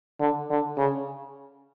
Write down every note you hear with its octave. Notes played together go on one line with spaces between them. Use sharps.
D3
D3
C#3